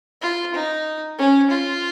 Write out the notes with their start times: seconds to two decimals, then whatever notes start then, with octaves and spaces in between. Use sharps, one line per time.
0.22 F4
0.54 D#4
1.18 C#4
1.50 F4